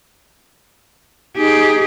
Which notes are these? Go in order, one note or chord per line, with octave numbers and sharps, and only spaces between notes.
D#4 G4 G#4